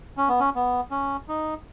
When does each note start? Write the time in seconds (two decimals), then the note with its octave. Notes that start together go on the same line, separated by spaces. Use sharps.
0.17 C#4
0.28 B3
0.40 C#4
0.55 B3
0.91 C#4
1.28 D#4